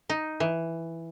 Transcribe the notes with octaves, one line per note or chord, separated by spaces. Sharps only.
D#4
E3